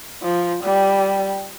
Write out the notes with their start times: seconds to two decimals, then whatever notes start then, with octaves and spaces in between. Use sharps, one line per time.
0.22 F3
0.63 G3